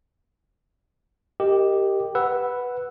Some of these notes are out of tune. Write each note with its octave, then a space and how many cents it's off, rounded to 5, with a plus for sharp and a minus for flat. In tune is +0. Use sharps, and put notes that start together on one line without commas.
G4 +0 A#4 -20 D#5 +0
B4 +0 F#5 +0 E6 +0